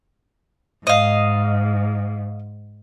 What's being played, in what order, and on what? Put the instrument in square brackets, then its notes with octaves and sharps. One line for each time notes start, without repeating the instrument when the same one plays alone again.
[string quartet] G#2 [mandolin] D#5 F5